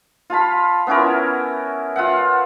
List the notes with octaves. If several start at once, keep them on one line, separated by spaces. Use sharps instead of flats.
F4 F5 A5 B5
B3 C#4 E4 A#4
F4 E5 F#5